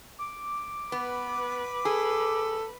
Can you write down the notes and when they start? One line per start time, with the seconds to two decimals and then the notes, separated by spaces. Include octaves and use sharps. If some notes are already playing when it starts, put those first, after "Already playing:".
0.18 D6
0.92 B3 B4
1.85 G#4 A4